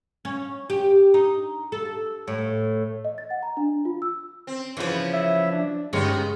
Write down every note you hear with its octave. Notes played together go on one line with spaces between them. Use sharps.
C#4
G4
D#4
A4
A2
D#5
A6
F#5
A#5
D4
F4
E6
C4
C#3 E3 F3 B3
E5
D4
G1 C#3 G#3 B3 D#4 G4 C#5 F5